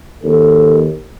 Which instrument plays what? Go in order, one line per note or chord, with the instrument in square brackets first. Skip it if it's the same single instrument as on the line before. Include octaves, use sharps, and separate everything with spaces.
[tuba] D#2 [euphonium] A4